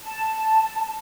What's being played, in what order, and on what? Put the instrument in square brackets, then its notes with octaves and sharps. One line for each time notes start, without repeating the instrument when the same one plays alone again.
[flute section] A5